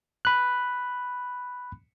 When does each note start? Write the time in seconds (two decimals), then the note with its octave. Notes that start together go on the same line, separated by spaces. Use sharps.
0.25 B5 F#6